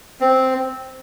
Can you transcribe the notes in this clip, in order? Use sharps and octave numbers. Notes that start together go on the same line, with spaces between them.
C4